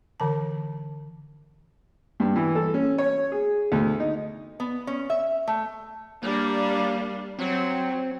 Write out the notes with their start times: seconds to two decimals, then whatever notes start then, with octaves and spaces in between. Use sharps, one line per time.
0.20 D3 E3 A5
2.20 G2
2.36 E3
2.55 A4
2.74 C#4
2.98 C#5
3.32 G#4
3.72 D2
4.00 D#4
4.60 B3
4.87 C#4
5.10 E5
5.48 A3
6.23 G3 A#3 D4
7.39 F#3 C4